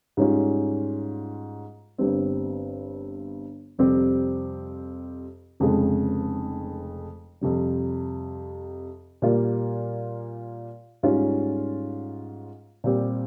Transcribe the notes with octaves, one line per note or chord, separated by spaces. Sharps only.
G#2 G3 C#4 F4
G1 G2 G3 C4
F2 C3 G3 C4 G4
F1 F2 C#3 F3 G#3
F2 C3 G3
A#2 G3 A#3 F4
G#2 G3 C#4 F4
A#2 G3 C4 G4